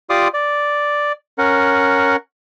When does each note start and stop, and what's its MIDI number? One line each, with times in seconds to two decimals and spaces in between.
0.10 0.28 65
0.10 0.28 67
0.10 0.28 74
0.10 0.28 84
0.10 0.28 86
0.10 0.28 87
0.34 1.12 74
1.38 2.16 61
1.38 2.16 70
1.38 2.16 78